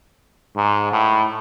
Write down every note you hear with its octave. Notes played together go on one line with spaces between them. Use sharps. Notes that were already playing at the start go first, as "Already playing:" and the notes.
G#2
A2